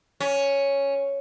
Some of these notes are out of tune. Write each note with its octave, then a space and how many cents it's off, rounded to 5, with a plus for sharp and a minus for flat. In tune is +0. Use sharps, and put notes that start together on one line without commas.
C#4 +0